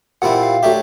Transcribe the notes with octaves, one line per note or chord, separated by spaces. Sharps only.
A#2 G3 C4 E4 F#5
F5
F#3 A3 D4 G4 E5